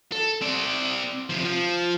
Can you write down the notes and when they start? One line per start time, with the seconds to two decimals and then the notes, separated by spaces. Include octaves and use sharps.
0.12 A4
0.42 C4 D5
1.30 C3 F3
1.45 F3